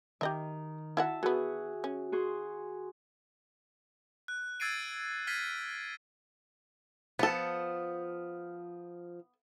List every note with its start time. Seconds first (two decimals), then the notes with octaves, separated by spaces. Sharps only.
0.21 D#3 G4 D#5 E5
0.97 E4 F#4 E5 F#5 A5
1.23 E3 B3 F#4 G#4
1.84 C#4
2.12 F#4 G#4 C6
4.28 F#6
4.60 E6 G#6 A6 C7 D7 D#7
5.27 F6 G#6 A6 B6 C7 D#7
7.19 F3 B3 A4